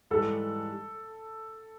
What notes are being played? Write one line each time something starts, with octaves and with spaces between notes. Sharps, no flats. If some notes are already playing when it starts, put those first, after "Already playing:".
G#2 E3 G3 A4